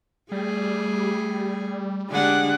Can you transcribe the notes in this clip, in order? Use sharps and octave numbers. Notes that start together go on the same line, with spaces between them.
G3 A3 G#4
D3 G#3 D4 G4 F#5